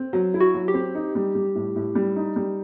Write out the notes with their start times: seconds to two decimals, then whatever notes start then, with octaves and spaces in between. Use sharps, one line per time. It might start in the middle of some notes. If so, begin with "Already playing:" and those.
Already playing: C4
0.13 F#3
0.34 E4
0.40 F#4
0.54 F#3
0.68 G4
0.74 C4
0.95 D#4
1.15 G3
1.35 G3
1.55 A2
1.76 A2
1.95 G3
2.16 D#4
2.36 G3